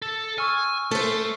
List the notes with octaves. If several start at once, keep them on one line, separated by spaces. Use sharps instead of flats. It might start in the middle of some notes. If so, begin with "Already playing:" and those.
A4
G#5 C#6 E6 F6
A3 A4 C5